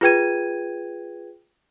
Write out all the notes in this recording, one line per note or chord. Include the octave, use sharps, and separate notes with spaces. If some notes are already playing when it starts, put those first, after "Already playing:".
F4 G#4 B4 G5 G#6 D#7